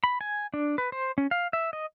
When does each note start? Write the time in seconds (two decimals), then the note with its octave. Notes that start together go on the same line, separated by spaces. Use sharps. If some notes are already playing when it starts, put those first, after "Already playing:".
0.04 B5
0.21 G#5
0.54 D4
0.78 B4
0.92 C5
1.18 C#4
1.31 F5
1.53 E5
1.73 D#5